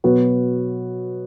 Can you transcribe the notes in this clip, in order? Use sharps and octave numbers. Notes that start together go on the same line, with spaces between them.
B2 F#3 B3 F#4